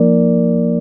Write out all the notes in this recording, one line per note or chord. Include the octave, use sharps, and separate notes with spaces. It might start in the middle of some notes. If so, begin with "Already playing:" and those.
Already playing: F3 A#3 D#4 A#4 D5